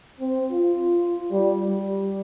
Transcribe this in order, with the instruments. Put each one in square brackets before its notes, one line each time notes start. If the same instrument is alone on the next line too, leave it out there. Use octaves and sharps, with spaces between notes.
[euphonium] C4
F4
G3
G3